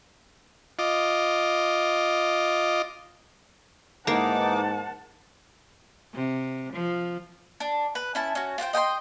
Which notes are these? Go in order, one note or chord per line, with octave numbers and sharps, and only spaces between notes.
F4 D#5 D6
G#2 E3 A#3 D#4 F#5 A5 D6
C3
F3
D4
B4
C#4 E4 A5
C#4 F#4
F4 C5 F#5 G5
D#5 G5 G#5 C6